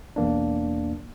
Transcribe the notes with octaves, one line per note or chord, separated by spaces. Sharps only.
B1 E2 A#3 D4